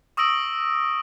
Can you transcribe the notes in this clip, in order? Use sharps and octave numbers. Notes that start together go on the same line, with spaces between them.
C#6 D#6 E6 A#6 D7 F#7